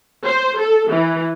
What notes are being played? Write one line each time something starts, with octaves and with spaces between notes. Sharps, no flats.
C5
A4
E3